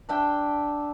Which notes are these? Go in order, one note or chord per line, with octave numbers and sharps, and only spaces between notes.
D4 E5 G5